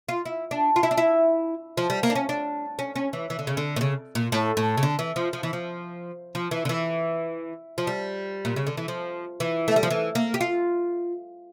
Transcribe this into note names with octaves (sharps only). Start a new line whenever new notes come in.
F4
E4
D4
F4
E4
D4
E4
F3
G3
A#3
D4
C#4
D4
C#4
C#4
E3
E3
D3
C#3
D3
A#2
C#3
A#2
A2
A2
C#3
D3
E3
F3
F3
E3
F3
F3
E3
D3
E3
F3
G3
A#2
C#3
D3
E3
F3
E3
A3
G3
F3
E3
A#3
G4
F4